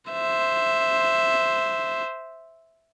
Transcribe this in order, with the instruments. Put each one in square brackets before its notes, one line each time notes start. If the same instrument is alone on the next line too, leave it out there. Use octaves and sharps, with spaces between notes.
[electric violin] C5 E5